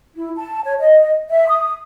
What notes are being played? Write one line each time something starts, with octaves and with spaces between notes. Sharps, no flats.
E4
A5
C#5
D#5
E5
D#6